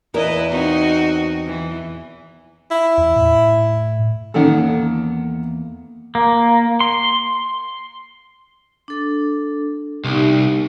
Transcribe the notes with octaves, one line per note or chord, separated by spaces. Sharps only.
E2 E4 A#4 B4 D#5
C4 D#4 F#4
E3
E4
E2
A2
E2 D#3 A#3 C#4 A4 F#5
A#3
C6
D4 A4
C2 B3 D#4 G4